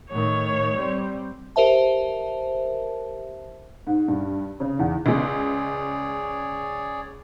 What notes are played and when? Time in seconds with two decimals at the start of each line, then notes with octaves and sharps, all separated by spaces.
0.11 A2 D#3 C#5
0.77 G3 C4
1.56 G4 A#4 C5 E5 A5
3.87 G#2
4.08 G2
4.60 C#3
4.79 E2
5.06 C#2 G#3 G#4 C#5 D5